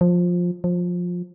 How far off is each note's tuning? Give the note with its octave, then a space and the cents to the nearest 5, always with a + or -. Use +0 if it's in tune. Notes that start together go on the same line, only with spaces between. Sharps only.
F3 +15
F3 +20